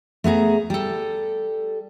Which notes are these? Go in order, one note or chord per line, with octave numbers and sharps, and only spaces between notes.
A3 B3 G#4 A#5
G3 A4